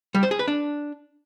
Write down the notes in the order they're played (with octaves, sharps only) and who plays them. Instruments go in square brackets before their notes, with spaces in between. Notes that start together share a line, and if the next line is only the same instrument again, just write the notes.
[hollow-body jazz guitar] G3
C5
G#4
B4
D4